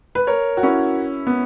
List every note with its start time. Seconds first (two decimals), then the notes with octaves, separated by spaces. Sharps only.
0.15 B4
0.27 A#4 C#5
0.57 F#4
0.63 C#4 E4
1.27 B3